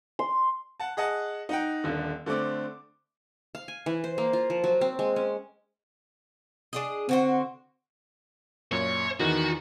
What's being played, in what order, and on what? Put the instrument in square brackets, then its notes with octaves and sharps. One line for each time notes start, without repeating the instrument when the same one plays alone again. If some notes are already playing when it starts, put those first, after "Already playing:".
[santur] C6
[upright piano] F#5 A5
G#4 D#5 F#5 A5
D#4 F#5 G5
D#1 D3
D3 A3 C4 D6
[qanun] F5
G#5
E3
C5
A#3
F4
F3
F#3
C4
G#3
C#4
[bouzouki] D4 G#4 D#5
[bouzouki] D3 F#4 C5 [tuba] C4
[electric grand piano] F#2 A#2 [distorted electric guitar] C#5
[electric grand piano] E2 D#3 E3 [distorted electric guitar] F#4